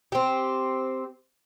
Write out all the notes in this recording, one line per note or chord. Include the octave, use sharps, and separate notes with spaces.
C4 G4